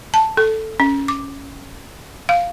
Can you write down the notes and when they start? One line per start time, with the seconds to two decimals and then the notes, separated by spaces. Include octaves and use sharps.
0.14 A5
0.37 A4
0.80 C#4
1.08 D6
2.29 F5